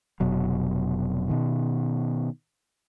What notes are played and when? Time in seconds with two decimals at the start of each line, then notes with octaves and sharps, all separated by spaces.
0.20 F1 B2 F#3
1.29 B2 D#3